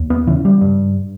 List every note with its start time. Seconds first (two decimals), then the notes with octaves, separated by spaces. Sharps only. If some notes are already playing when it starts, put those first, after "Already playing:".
Already playing: D#2
0.10 B3
0.27 C#3 E3
0.45 G3
0.61 G2